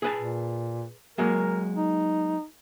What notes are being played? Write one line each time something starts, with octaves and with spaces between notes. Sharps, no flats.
G#4 B4 A5
A#2
F#3 G#3 A#3 A#4
D#4